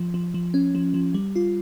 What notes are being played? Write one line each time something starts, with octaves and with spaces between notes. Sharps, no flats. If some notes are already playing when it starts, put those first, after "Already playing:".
Already playing: F3
F3
F3
C#4
F3
F3
G3
F4